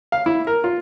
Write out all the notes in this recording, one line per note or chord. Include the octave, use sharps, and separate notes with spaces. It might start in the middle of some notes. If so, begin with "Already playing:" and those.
F5
E4
A#4
F4